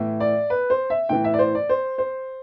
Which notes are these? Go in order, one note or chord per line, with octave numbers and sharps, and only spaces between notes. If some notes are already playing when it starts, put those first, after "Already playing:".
Already playing: A2 E3
D5
B4
C5
E5
A2 E3 G5
E5
D5
C5
D5
C5
C5